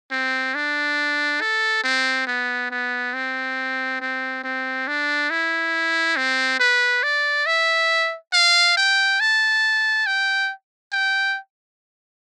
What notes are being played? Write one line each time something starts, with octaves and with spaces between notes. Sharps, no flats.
C4
D4
A4
C4
B3
B3
C4
C4
C4
D4
E4
C4
B4
D5
E5
F5
G5
A5
G5
G5